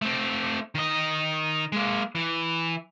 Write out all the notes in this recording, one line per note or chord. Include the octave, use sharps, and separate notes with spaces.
A3 C4
D#3 D#5
G#3 A#3
E3